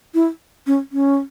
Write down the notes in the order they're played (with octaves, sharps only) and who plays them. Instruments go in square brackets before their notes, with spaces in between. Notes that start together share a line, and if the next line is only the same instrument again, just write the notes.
[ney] E4
C#4
C#4